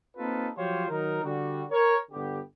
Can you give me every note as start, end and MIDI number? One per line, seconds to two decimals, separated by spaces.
0.17 0.49 58
0.17 0.49 60
0.17 0.49 63
0.17 0.49 65
0.17 0.49 69
0.17 0.49 71
0.57 0.85 53
0.57 0.85 54
0.57 0.85 65
0.57 0.85 67
0.57 0.85 72
0.57 0.85 73
0.89 1.23 51
0.89 1.23 54
0.89 1.23 63
0.89 1.23 70
1.23 1.63 50
1.23 1.63 55
1.23 1.63 66
1.70 1.95 70
1.70 1.95 73
2.11 2.39 31
2.11 2.39 50
2.11 2.39 59
2.11 2.39 67